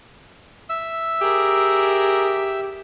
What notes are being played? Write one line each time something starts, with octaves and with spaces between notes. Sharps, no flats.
E5 E6
G4 G#4 A#4